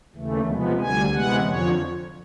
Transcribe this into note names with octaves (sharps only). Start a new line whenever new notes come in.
D#2 C#3 E3 A3
C3 F3 G#3 B3
D2 D3 G3 G#5
C3 E3 G#3 B3 F#5
F2 D3 F3 C#5